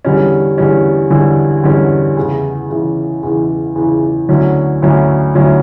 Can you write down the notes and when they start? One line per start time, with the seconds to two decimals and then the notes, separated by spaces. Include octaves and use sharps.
0.05 E2 D3 G3 C#4
0.58 E2 D3 G3 C#4
1.10 E2 D3 G3 C#4
1.63 E2 D3 G3 C#4
2.17 E2 C#3 E3
2.70 E2 C#3 E3
3.23 E2 C#3 E3
3.75 E2 C#3 E3
4.29 D2 D3 F#3 C#4 E4
4.82 D2 D3 F#3 C#4 E4
5.35 D2 D3 F#3 C#4 E4